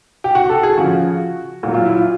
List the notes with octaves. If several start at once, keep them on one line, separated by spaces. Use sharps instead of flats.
G4
F#4
A4
G#4
C#3 F3 F#4
A#2 F#3 F#4
F4
E4
F4